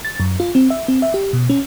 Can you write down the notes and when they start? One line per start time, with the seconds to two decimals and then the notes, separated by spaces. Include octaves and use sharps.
0.05 A6
0.20 F#2
0.40 F4
0.55 C4
0.70 E5
0.88 C4
1.02 E5
1.14 G4
1.33 B2
1.50 C#4